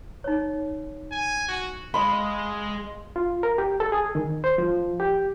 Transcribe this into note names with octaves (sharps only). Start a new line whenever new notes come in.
D#4 C#5
G#5
F#4
G#3 D#5 F5 B5 C6
F4
A#4
G4
A4
G#4
D#3
C5
F3
G4